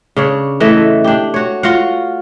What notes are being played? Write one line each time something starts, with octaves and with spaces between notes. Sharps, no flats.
C#3 D4 C#5
E3 A3 D#5 E5
D4 G4
F#4 C#5
F4 F#4 F5 F#5